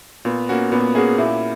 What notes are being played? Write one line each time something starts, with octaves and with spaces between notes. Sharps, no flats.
A#2 B3
A#3 C#4 F#4
A#2 B3
A#3 C#4 F#4 G#4
A#2 E4